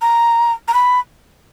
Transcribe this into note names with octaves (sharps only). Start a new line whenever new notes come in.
A#5
A#5
B5